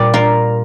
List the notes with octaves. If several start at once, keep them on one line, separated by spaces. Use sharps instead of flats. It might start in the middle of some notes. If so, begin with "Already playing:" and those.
Already playing: A#2 G3 D5
F4 A#4